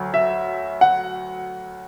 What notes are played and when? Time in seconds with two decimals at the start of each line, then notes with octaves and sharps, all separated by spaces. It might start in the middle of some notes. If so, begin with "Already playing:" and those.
Already playing: D2 F#3
0.14 E5
0.81 F#5